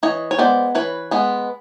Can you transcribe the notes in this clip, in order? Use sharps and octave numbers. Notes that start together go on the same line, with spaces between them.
E3 C#5 D#5
C#5
G#3 B3 C5 D5
E3 B4 C#5
G#3 B3